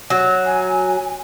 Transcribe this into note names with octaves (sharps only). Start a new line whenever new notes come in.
F#3
G#5